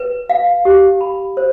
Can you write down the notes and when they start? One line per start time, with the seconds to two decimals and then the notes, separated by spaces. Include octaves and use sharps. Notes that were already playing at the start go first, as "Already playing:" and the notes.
Already playing: B4
0.30 F5
0.65 G4
1.01 B5
1.37 C5